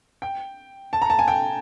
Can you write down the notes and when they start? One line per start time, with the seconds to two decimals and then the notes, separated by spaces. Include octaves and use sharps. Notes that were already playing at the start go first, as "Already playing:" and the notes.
0.22 G5
0.93 A5
1.02 A#5
1.10 A5
1.19 G#5
1.28 G5